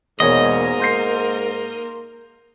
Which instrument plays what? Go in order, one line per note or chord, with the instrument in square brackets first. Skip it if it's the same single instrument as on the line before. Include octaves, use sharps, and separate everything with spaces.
[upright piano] E1 C#5 [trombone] G#2 [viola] A#3 A#4 [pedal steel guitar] D#5
[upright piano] C6 G6 C7